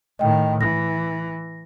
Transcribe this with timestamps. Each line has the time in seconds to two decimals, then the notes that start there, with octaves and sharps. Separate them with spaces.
0.19 A2 D#3 D#5 G5
0.61 E3 A#6